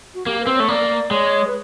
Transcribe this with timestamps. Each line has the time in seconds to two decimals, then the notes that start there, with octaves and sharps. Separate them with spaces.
0.14 F#4
0.26 A#3 G4
0.40 B4
0.47 C4
0.54 C#5
0.60 A3
0.68 A#3 D5
1.11 G#3 C#5
1.47 B4